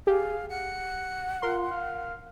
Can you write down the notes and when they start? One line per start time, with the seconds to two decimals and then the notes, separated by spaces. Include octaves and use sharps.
0.07 G4 G#4 F5
0.50 F#5 C#7
1.42 F4 A#4 C6
1.71 F5